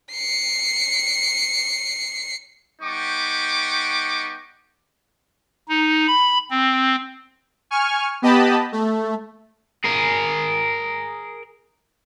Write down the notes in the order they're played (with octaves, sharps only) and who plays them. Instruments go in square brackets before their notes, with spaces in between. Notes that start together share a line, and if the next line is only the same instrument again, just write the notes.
[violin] C7 C#7
[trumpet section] G3 B3 D#4 G5 C#6 D6
[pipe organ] D#4
B5
C4
[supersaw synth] G#5 C#6 F6
B3 G4 D#5 A5 B5
A3
[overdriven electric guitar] G#4 A#4